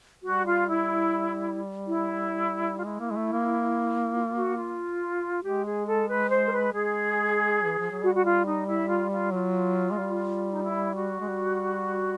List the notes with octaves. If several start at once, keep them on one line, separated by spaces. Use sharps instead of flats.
G3 F#4
F4
E4
E4
F4
G#3 E4
A#3
G#3
A3
A#3
F4
F#4
F4
G#3 G4
G#4
A4
B4
C5
A#4
B4
G#3 G#4
E3
F3
F#3
G3 F#4
F#4
F4
D#4
E4
F4
F4
F#3 F4
G#3
G3
D#4
E4
F#4
G#3
G3